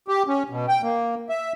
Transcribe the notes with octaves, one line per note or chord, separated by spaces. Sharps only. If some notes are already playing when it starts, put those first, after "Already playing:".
G4
C#4
B2
G5
A#3
E5